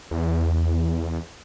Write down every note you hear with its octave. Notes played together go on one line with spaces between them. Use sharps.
E2